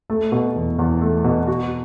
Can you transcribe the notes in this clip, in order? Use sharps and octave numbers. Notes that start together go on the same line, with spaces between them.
A3
B2
E2
E2
A3
B2
F#4